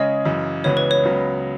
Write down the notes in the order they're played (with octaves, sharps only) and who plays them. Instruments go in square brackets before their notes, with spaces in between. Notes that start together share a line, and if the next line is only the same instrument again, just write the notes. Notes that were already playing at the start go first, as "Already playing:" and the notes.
Already playing: [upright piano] C#3 G#3 C#4 G#4 C#5 [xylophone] D#5
[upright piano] F#2 C#3 E3
[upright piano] C#2 C#3 E3 B3 F#4 [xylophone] C#5
[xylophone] B4
C#5
[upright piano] C#2 C#3 F#3 B3